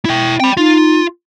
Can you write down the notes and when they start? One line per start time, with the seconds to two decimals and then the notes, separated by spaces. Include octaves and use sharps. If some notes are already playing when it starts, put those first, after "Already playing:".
0.05 E4 G5
0.40 C4 G5 B5
0.57 D#4 F4